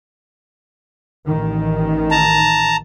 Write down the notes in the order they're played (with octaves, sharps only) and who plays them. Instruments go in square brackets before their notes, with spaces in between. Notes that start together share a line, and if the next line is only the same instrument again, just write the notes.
[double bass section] A1 D#3
[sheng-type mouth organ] A5 A#5